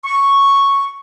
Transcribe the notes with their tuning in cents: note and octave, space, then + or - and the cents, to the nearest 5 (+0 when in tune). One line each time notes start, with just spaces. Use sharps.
C#6 +0